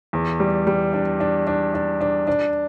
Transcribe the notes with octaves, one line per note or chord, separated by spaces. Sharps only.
E2
G3
G3
D4
D4
D4
D4
D4
D4